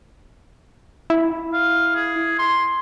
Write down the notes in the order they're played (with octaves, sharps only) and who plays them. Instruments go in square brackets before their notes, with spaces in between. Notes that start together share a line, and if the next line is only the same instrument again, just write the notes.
[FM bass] E4
[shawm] F5
G#4
C6